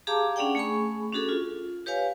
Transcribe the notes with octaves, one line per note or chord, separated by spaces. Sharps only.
G4 G#4 F5 A5 A#5 D6
C#4 D4 G#4 D5 F#5 G5
A3 G#4 G#5 B5 C#6
C#4 D4 F#4 G#4 A4
F4
G4 B4 C#5 F5 G#5